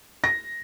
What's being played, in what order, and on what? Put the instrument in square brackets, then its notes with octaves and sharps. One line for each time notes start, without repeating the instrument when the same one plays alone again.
[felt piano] A#6